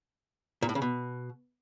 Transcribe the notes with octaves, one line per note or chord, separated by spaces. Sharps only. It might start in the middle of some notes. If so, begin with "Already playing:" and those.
A#2
A2
C#3
B2